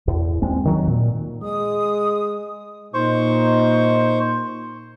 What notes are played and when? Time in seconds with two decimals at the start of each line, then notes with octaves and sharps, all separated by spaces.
0.08 E2
0.42 D#2 G#3 C4
0.65 D#3 F#3
0.87 A#2
1.43 G#3 D#6
2.94 A#2 D#4 C5 C#6